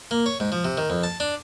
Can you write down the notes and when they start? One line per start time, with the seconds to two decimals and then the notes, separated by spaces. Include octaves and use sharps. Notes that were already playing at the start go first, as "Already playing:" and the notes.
0.11 A#3
0.26 C#5
0.40 G#2
0.52 F3
0.65 C3
0.77 D#3
0.90 F2
1.03 A5
1.20 D4